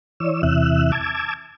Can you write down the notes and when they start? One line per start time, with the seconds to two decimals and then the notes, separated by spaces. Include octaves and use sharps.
0.20 E3 C#5 D5 E6
0.43 E2 C3 E3 E5 E6 F#6
0.92 A5 D6 E6 G#6